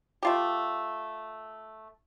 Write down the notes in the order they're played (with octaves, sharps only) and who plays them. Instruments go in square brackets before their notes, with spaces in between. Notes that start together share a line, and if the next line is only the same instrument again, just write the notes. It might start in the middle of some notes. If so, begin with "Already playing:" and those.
[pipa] A3 F4 G4